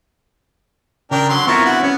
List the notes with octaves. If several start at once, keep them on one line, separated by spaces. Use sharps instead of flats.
C#3 D4 A#4 G5
D3 F#3 C6
B3 C4 E4 F4 A#4 C#6
D3 F#4
B3 C#4